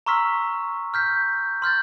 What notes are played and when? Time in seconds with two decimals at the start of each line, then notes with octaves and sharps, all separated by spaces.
0.06 A#5 C6 C#6 E6 F6 B6
0.94 F6 G6 B6
1.62 C6 F6 G6 A6